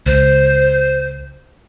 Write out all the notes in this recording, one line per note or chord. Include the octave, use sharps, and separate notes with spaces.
C#2 C5